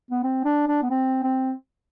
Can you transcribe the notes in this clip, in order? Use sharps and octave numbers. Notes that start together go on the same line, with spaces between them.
B3
C4
D4
D4
B3
C4
C4